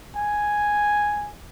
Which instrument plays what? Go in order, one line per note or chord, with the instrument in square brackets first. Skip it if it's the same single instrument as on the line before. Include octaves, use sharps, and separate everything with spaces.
[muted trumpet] G#5